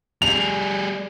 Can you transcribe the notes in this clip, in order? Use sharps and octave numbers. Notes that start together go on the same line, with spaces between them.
G3 G#4 F7